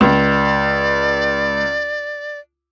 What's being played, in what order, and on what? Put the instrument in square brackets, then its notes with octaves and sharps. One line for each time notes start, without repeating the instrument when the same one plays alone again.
[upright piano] C#2 [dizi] D5